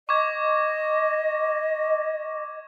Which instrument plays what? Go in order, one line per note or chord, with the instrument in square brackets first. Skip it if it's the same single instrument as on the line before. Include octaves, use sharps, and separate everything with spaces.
[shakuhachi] D#5 [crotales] C#6 D6 G#6